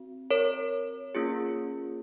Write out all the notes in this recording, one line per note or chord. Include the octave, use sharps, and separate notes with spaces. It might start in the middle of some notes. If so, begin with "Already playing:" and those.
Already playing: C4 F#4
A#4 C#5
A#3 C#4 F4 G#4